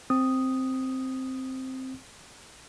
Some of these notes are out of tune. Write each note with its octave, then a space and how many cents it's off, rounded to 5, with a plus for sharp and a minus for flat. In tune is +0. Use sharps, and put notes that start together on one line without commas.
C4 +0 D#6 +0